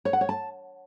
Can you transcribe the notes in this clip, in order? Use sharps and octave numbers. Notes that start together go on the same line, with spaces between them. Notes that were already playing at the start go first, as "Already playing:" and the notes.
C#5
F#5
C#5
A5